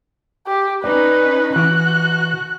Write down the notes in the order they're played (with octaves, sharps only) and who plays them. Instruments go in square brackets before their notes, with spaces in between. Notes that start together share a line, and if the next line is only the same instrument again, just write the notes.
[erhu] G4
[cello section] C#4 D#4 [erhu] B4 [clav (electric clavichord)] D5
[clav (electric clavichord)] E3 [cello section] F#4 [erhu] F#6